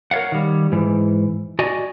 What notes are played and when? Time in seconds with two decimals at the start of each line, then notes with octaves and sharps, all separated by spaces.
0.11 A#4 C#5 D5 F5 F#5
0.32 D#3 G3
0.72 G#2 E3
1.59 F#4 D5 D#5 G#5